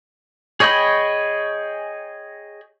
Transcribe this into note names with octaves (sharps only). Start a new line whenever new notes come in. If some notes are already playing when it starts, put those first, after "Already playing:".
G#4 C#5 D#5 G5 B5